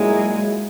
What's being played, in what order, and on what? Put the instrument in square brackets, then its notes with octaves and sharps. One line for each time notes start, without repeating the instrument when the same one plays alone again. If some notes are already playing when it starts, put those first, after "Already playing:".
Already playing: [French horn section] A#2 F#3 A#3 E4 G#4 [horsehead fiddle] G#3